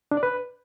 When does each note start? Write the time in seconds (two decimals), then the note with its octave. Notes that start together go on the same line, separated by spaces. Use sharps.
0.11 D4
0.17 D5
0.23 B4